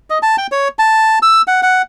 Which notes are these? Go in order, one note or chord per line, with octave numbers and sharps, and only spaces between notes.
D#5
A5
G5
C#5
A5
E6
F#5
F#5